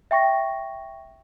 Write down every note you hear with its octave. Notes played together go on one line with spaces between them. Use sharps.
E5 G5 C#6 A#6